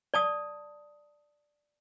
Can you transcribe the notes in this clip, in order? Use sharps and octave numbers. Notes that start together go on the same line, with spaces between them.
D5 A5 D#6